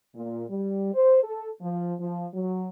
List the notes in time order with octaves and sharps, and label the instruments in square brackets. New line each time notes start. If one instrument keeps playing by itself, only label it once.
[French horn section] A#2
G3
C5
A4
F3
F3
F#3